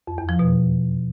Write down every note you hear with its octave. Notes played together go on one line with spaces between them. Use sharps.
F2
E2
F3
B2